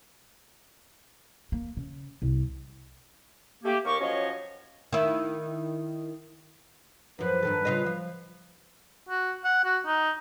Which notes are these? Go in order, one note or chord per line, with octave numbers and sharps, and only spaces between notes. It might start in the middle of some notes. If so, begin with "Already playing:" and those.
A#3
C#3
C2
A3 A#3 G4
D#2 A#3 G4 A#4 C#6
F3 F#3 C#4 C#5 D#5
D#3 E4
F#2 F3 B4
G2 D#3 A4
C#3 F4 D#5
F3
F#4
F#5
F#4
D#4